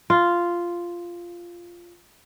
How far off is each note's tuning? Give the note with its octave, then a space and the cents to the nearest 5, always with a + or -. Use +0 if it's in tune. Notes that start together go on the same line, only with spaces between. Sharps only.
F4 -5